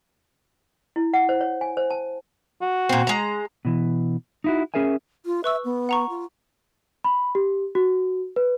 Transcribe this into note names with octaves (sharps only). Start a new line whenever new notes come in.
E4
F#5
C5
C#5
G#5
C5
A5
F#4
A#2 C4
G#3 A#5
B2 E3
D#4 E4 F#4
C#4 G#4 A#4 E5 G#5
F4
B4 E5 C#6 E6
B3
F#5 A#5 C#6
F4
B5
G4
F#4
B4